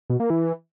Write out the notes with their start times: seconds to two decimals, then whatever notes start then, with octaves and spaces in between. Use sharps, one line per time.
0.10 B2
0.20 A#3
0.30 E3